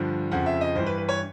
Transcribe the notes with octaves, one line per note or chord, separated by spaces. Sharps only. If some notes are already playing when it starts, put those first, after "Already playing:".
Already playing: G2 D3 F3
F2 C#3 F3 F#5
E5
D#5
G2 E3 C5
B4
B4
C#5